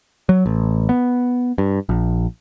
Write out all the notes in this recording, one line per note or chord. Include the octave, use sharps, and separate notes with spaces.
F#3
A1
B3
G2
A#1